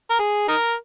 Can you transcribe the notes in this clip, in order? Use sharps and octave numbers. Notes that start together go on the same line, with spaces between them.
A#4
G#4
D#4 A#4